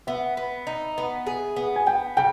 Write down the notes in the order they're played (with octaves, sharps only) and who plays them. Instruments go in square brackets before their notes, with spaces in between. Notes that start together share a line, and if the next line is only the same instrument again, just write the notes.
[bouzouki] B3 [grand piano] E5
[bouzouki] B3
D#4
B3
G#4
B3
[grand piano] G#5
[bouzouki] B3 [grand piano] G5
[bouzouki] C#3 [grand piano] G5